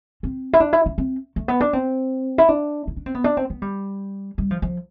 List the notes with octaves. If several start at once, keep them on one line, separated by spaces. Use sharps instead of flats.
C4
E4
D4
E4
D4
C4
A3
B3
D4
C4
E4
D4
E4
D4
C4
B3
D4
C4
B3
G3
G3
F3
F3